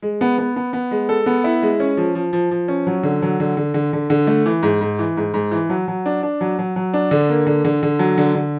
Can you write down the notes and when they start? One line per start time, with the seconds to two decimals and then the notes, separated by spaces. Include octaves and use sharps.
0.02 G#3
0.21 B3
0.38 B3
0.56 B3
0.73 B3
0.91 G#3
1.09 A4
1.26 B3
1.44 E4
1.62 G#3
1.80 C#4
1.97 F3
2.15 F3
2.33 F3
2.51 F3
2.68 C#4
2.87 F#3
3.03 D3
3.22 F#3
3.40 D3
3.57 D3
3.74 D3
3.93 D3
4.10 D3
4.27 A3
4.46 E3
4.63 G#2
4.81 G#2
4.99 E3
5.17 G#2
5.34 G#2
5.52 E3
5.70 F#3
5.88 F#3
6.06 D4
6.23 D4
6.41 F#3
6.59 F#3
6.76 F#3
6.94 D4
7.11 D3
7.29 A#3
7.47 D3
7.65 D3
7.83 D3
7.99 F#3
8.18 D3
8.35 D3